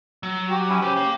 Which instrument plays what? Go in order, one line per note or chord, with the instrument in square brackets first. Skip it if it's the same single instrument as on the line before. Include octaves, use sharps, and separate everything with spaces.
[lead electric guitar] F#3
[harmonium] F#4 G4
[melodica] C#4 E4
[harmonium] C#3 [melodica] G4 [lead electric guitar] B4 C5
[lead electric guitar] A#3